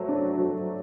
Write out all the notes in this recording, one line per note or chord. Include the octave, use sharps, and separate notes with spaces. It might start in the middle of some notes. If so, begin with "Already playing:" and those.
Already playing: F#3 A3 C5
D4
F#3